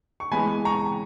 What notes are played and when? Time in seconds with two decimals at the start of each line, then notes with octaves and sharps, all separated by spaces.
0.20 C#6
0.31 E3 G#3 B3 G#5 B5
0.65 A#5 C#6